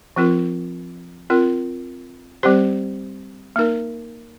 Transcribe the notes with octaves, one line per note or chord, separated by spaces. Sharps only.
F3 C4 F4 A#4
C4 F4 A#4
G3 C4 G4 C5
A#3 D#4 A#4